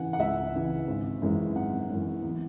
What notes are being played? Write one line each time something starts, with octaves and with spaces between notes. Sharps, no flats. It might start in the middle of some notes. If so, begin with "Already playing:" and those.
Already playing: C#3 E3 F#5 G#5
F#5
C#2 E5
C#3 E3
G#1
F#2 E3 G#3 C#4
G#1 F#5
F#2 E3 G#3 C#4
E2